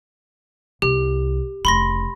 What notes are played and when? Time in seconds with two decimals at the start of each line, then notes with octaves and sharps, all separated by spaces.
0.82 C2 G4
1.65 F1 C#3 B5 C6 A#6